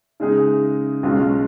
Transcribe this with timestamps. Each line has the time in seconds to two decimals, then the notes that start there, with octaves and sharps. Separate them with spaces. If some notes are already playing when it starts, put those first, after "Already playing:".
0.20 C#3 G#3 D#4 G#4
1.03 B1 B2 G#3 C#4 F4